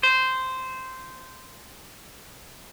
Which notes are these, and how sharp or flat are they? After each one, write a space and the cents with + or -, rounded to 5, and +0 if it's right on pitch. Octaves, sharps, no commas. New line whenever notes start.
C5 -10